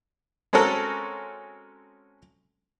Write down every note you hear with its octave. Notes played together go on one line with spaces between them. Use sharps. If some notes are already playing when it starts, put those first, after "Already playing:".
G#3 C4 C#4 F#4 A4 A#4